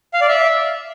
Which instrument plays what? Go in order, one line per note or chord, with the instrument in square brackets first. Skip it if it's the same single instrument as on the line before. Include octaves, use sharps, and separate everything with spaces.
[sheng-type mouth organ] F5
D5
E5